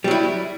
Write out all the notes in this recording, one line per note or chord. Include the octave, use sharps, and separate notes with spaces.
F#3 G3 E4